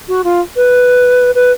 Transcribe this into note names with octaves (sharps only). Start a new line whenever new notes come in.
F#4
F4
B4
B4